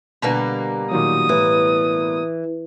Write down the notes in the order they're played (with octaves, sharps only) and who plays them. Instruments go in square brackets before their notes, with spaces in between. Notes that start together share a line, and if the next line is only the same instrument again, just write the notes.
[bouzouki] B2 G3 A#3 [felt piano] D3 B4 A#5
[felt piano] A#2 D#3 F#3 [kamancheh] D#6
[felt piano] A2 [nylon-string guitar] E3